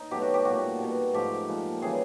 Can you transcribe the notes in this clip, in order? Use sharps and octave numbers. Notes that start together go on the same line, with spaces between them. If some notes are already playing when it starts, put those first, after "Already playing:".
Already playing: D#4
B2 F#3 A3 G4
F#4
G4
A#2 G3 F#4
B2 G3
G#2 F3 A3 G4
A#2 F3 G#3
C#3 E3 G3 G#4